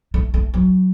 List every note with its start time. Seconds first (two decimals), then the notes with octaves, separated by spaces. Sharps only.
0.14 A3
0.34 A3
0.54 F#3